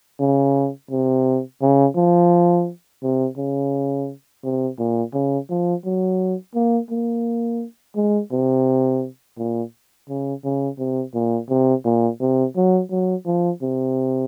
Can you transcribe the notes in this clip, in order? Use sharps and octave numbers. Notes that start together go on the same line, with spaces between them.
C#3
C3
C#3
F3
C3
C#3
C3
A#2
C#3
F3
F#3
A#3
A#3
G#3
C3
A#2
C#3
C#3
C3
A#2
C3
A#2
C3
F#3
F#3
F3
C3